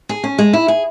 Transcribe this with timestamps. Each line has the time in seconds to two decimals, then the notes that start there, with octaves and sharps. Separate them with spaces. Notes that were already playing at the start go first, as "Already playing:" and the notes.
0.09 G#4
0.24 C#4
0.38 G#3
0.53 E4
0.68 G#4